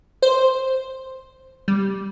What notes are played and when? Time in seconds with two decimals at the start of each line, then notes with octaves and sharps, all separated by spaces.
0.22 C5
1.68 G3